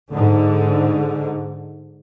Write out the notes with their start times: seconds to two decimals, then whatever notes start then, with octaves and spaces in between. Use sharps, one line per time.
0.11 G#2 D3